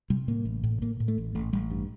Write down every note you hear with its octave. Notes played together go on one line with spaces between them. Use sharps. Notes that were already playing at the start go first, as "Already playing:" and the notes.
C3 G3
A2 A#3
A1
A2
A2 A#3
A2
A3
A1
A1 A3
A1 G3
G2